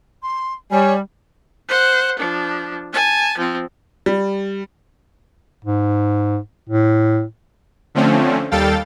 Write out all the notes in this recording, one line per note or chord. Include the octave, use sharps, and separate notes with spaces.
C6
G3 C#5 G#5
C5 F#5
F3 D4
G#5 A5
F3 C4
G3
G#2
A2
D3 F3 A3 C4 C#4
D#2 G3 A4 F5 G5 A6